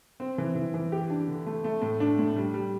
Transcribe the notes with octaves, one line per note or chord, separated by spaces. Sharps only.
C4
E3
E3
E3
G4
D4
D3
A3
A3
A2
D4
A2
G3
G3